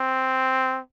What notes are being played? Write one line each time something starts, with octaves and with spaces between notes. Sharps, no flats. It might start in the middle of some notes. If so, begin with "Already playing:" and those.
Already playing: C4